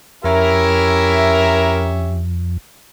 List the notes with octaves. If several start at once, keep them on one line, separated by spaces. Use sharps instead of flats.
F2 C#4 E4 G4 A#4 E5